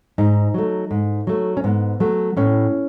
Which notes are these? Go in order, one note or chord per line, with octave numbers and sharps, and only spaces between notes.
G#2 D#4
F#3 A3
G#2
F#3 A3
C#4
G#2 B3
F#3 A3
A2 C#4